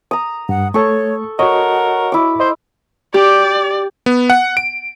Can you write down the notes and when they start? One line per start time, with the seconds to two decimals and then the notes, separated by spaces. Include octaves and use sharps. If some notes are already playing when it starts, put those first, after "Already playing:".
0.11 A#5 D#6
0.49 G2 F#5
0.74 A3 A4 C#5 C#6
1.39 F#4 A#4 C#5 D#5 F#5
2.12 E4 D6
2.40 C5 D#5
3.14 G4 D5
4.06 B3
4.30 F#5
4.57 D7